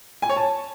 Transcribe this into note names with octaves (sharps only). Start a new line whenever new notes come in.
G#5
C#5
A5